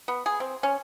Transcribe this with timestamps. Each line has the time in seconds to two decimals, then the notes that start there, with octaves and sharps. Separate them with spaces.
0.08 B3
0.26 G#4
0.40 C4
0.63 C#4